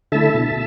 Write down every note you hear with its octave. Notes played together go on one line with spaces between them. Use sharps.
D3 A3 E4 E5 A5
B2